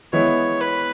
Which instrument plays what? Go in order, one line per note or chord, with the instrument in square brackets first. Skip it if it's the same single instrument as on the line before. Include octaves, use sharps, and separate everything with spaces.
[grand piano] E3 G#3 B3 E4 [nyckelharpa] C#5
[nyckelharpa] B4